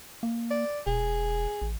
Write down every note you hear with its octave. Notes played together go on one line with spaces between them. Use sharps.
A#3
D5
E1 G#4
A1